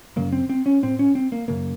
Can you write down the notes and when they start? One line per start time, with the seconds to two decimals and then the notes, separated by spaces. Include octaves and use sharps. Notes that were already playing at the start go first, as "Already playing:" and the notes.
0.16 F#2 C#3 A#3
0.32 C4
0.49 C4
0.66 C#4
0.83 A2 C4
0.99 C#4
1.15 C4
1.32 A#3
1.48 F#2 C#3 A#3